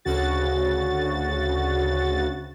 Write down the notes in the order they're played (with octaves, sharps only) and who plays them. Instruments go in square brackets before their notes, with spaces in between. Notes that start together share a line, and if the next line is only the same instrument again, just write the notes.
[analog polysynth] D2 C#3 F#4 A6